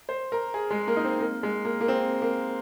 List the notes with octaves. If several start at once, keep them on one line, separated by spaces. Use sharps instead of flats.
C5
A#4
G#4
G#3
A#3
D#4
C4
A#3
G#3
A#3
A#3
C4
A#3